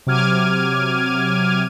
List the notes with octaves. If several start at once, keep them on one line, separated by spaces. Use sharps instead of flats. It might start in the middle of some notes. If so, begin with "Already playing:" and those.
C3 F#3 D6 F6 G#6 D#7